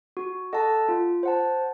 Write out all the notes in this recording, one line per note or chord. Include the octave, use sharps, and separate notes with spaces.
F#4
A4 D#5 F#5 A5
F4
C5 F#5 A5